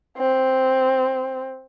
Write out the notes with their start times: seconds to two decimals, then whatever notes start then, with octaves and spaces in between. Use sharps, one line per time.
0.18 C4